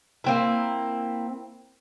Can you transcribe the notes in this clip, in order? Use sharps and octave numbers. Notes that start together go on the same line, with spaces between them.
A#3 C4 E4